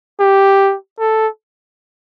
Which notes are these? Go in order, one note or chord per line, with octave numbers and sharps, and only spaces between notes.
G4
A4